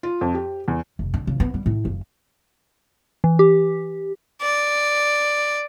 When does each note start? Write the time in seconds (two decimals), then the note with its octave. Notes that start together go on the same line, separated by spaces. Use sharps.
0.03 F4
0.21 F2
0.35 G4
0.68 E2
0.99 F1
1.14 D3
1.27 C#3
1.40 B3
1.54 G3
1.66 A2
1.85 F#1
3.24 E3
3.39 G4
4.42 D5